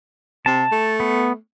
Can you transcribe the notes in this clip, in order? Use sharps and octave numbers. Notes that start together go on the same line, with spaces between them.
C3 A5
A3
B3